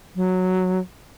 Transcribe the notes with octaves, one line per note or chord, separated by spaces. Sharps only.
F#3